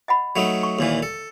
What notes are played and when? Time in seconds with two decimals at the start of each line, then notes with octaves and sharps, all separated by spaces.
0.08 D#5 F#5 B5
0.36 F#3 A3 D#4
0.63 C#6
0.79 D#2 A#2 E3
1.03 A4